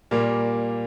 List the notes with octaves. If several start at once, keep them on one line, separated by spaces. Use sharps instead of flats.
A#2 G3 A#3